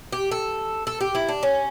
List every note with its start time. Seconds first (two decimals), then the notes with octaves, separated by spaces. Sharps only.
0.12 G4
0.31 A4
0.87 A4
1.01 G4
1.15 E4
1.29 D4
1.43 C#4